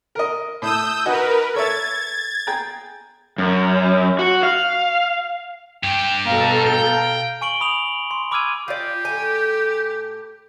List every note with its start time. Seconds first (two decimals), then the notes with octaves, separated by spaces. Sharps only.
0.15 A#4 D#5
0.62 A2 D#6 E6 G6
1.06 D#4 F#4 A#4 B4 G#5
1.54 A4 C#5 E5 G#6 A6
2.47 G#4 G5 A#5
3.38 F#2
4.19 F#4
4.43 F5
5.83 G2 G4 G5
6.26 B2 A4 F5 A#5
6.66 G5
7.41 G#5 C#6 D7 F#7 G7
7.61 B5 D#6 F7 F#7
8.11 C6
8.31 B5 D6 E6 F6 G#6 D#7
8.68 F4 G4 D5
9.05 A2 G#5